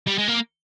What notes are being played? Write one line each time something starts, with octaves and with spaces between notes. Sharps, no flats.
G3
G#3
A#3